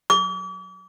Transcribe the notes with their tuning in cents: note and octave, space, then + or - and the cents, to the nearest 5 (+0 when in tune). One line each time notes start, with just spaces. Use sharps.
D6 -40